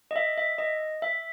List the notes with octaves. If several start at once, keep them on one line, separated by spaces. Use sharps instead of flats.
D#5
E5
E5
D#5
E5